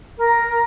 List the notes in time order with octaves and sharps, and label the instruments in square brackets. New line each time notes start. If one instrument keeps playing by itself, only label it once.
[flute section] A#4